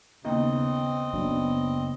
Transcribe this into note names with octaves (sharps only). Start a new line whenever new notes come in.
D#2 C#3 B3 C4 D#4 D#5
F#1 F#3 B3 D4